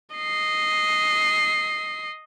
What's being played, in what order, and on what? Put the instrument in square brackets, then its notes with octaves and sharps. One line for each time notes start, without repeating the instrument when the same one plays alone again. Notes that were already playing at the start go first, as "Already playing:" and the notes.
[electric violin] D#5 C7